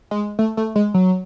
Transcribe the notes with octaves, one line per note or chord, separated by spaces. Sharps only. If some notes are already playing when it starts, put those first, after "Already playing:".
G#3
A3
A3
G#3
F#3